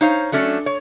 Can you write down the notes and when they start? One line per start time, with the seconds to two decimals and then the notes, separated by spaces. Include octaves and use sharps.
0.01 D#4 C5 C#5 F5
0.32 F#3 A3 C#4 D4
0.66 C#5